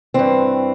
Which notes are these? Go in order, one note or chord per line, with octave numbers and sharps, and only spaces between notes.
G2 E3 C4